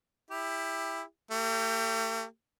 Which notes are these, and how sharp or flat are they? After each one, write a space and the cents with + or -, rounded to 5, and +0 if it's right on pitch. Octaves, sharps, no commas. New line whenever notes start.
E4 +0 G4 +30
A3 +45 G4 +0